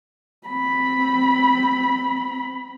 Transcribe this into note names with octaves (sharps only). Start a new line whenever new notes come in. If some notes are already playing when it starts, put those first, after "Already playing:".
C4 B5